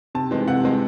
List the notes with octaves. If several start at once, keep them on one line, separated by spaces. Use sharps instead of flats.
C3 A5
E3 G#3 C4
C3 F#5
E3 G#3 C4